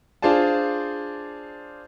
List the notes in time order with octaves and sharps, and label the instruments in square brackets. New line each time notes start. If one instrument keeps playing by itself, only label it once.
[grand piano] D4 F4 G#4 C5 D5 A5